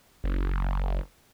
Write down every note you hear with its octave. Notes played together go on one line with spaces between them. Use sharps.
F#1